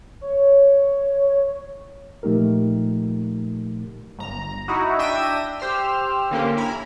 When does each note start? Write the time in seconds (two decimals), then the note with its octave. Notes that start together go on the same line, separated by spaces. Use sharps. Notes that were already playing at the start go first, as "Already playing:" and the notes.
0.21 C#5
2.23 A#2 F3 A3 D#4 G4 A#4
4.19 G1 A#5
4.68 D#4 E4 F#4
4.99 D4 E5 G5 E6 A#6 D#7
5.60 G4 C5 E6 F6
6.31 D3 A#3 C#4 G4
6.57 E4 G#5 A#5 B5